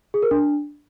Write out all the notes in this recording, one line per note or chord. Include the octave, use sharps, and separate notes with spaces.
G#4
A#4
D4